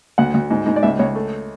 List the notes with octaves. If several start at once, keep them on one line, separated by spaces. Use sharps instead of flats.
D2 F#5
D2
G#2
G#2
D5
C#2 E5
C#2 C#5
A3